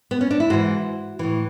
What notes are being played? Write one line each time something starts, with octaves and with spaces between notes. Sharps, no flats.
B3
C#4
D4
E4
G#2 E3 F#4
A2 E3